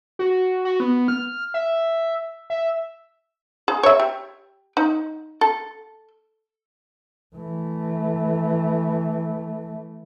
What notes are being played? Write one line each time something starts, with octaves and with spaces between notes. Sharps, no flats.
F#4
F#4
B3
F6
E5
E5
G#4
C#5 E5
G4
D#4
A4
E3 A3